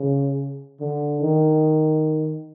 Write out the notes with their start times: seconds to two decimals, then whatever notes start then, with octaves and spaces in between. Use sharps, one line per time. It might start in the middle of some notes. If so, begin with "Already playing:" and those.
Already playing: C#3
0.80 D3
1.21 D#3